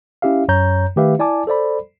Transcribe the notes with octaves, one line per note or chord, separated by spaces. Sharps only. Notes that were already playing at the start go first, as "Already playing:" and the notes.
C#4 E4 G4 E5 F5
F#2 C#5 A#5 G6
D#3 A3 G4 B4 E5 F5
E4 D5 G#5 A5 D6
A4 C5 D5 B5